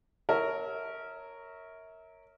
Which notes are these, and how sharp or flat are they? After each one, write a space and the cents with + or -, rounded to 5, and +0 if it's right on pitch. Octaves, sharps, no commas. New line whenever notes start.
A#4 -10 C#5 +0 E5 -35